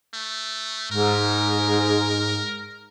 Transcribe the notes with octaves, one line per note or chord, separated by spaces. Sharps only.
A3
G#2 A#4